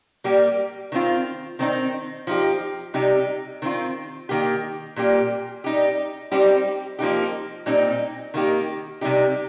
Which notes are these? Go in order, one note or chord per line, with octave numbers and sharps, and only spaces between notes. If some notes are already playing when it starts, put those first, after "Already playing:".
G3 A#3 G4
D#3 C4 F4
D#3 C4 D#4
F3 D#4 G4
C3 G3 D#4 G4
D#3 C4 F4
D#3 A#3 G4
A#2 G3 A#3 G4
G3 D#4 G4
G3 C4 D#4 G4
F3 A#3 D#4 G4
A#2 G3 C4 D#4
D#3 A#3 D#4 G4
C3 G3 D#4 G4